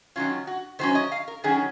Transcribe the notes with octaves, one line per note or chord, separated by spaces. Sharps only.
D#3 F#3 C#4 F4
F#4
D#3 F#3 C#4 C5
D#5
F5
A#4
D#3 F#3 C#4 G#4